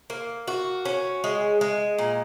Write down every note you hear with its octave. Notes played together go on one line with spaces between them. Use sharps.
A#3
F#4
C#4
G#3
G#3
A#2